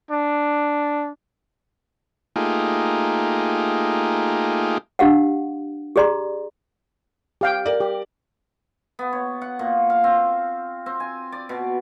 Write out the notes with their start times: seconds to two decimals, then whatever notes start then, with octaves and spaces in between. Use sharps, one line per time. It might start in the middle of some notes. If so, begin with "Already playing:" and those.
0.11 D4
2.36 A3 A#3 D#4 F4 G4 G#4
4.99 D4 G4 F5 F#5
5.96 G4 G#4 D5 A#5 C6
7.41 G4 F5 G5
7.66 A#4 D5
7.80 G4
8.99 B3
9.13 C#5
9.42 F#5
9.59 A#2
9.90 F5
10.04 C4
10.86 C4
11.00 G#5
11.32 D5
11.49 B2